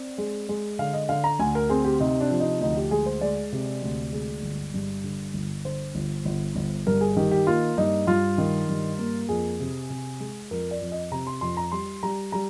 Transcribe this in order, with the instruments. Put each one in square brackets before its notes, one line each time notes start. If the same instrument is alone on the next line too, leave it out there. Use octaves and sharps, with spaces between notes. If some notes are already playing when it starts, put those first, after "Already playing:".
Already playing: [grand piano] C4 D5
G#3
G#3
D3 F5
D#5
D3 F5
A#5
D2 G#5
A#4
C4 G#4
G4
C3 D#4
D4
F3
D#4
D2 D#4
G4
G#3 G#4
C5
G#3 D5
C3
D2
G#3
G1
G2
D3
G1
D3 C5
G1
G1
G1
G2 A#4
G#4
D#3 G4
G4
A#3 F4
G2 D#4
G2 F4
D#3
G2
A#3
F2 G#4
C3
C3
G#3
F2 A#4
D5
F2
D#5
C3 A#5
C6
F2 C6
A#5
G3 C6
G3 A#5
G3 A#5